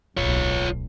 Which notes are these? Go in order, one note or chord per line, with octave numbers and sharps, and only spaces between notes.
D1 B1 A#2 F4 C#5